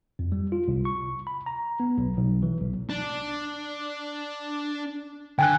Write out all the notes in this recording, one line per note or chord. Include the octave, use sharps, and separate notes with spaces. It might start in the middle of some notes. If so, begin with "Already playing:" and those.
F2
G3
F4
C2
C#6
B5
A#5
B3
B1
B1
E3
B1
D4
D3 G5 G#5 F#6